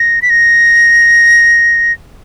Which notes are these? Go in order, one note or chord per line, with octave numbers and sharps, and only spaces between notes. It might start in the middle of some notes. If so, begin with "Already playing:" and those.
Already playing: A#6
B6
A#6